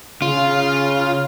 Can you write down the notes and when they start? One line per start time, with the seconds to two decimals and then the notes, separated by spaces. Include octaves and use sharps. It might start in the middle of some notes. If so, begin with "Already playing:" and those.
0.22 C#3 F4